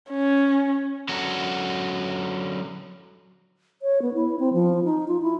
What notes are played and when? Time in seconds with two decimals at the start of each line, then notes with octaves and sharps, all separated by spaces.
0.10 C#4
1.09 D3 F#3 C#4 F#4 A4
3.82 C#5
4.02 B3
4.14 E4
4.40 C4
4.53 F3
4.84 D#4
5.08 F4
5.22 E4